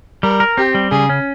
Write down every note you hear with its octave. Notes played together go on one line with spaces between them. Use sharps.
G3 A#4
A#4
C4 G4
G3
C#3 G#4
C#4